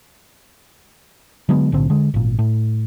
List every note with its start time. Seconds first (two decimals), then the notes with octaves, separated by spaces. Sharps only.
1.49 D3 F#3 G#3 B3
1.72 B1 A2 D3 C4
1.90 D3 G#3
2.14 G#1 A#2
2.39 A2